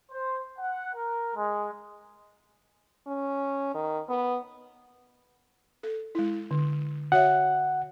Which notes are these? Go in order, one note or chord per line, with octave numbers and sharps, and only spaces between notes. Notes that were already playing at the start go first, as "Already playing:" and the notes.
C5
F#5
A#4
G#3
C#4
D#3
B3
A4
G#3 E4
D3
F#4 C#5 E5 F#5